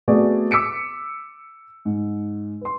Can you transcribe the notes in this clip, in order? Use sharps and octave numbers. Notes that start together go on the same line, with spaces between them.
A3 B3 C4 F#4 G#4 D5
D6 E6 B6 C#7 D7
G#2
B4 C6